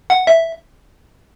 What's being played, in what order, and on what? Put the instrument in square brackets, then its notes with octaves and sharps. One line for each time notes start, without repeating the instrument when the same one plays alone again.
[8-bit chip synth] F#5
E5